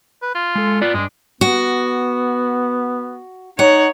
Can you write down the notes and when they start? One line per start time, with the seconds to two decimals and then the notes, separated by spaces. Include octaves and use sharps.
0.23 B4
0.35 F4
0.55 G#3 A4
0.82 B3 F4 D5
0.94 G2 G#3 D4
1.41 B3 F#4
3.59 D#4 C#5 F#5